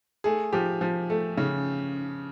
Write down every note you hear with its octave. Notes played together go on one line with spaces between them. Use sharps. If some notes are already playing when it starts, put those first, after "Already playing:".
A3 G#4
F3 G4
F3
A3
C#3